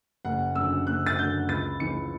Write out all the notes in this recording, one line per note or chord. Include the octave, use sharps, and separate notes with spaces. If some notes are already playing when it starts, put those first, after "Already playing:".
F#1 F#5
F#2 D3 E6
F#1 F#6
A6
F#2 D3 G6
C#2 A6
C#3 E3 C#7